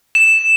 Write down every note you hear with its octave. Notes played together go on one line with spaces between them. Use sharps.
E7